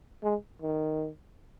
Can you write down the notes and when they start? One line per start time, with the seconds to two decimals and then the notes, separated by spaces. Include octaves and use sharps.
0.23 G#3
0.62 D#3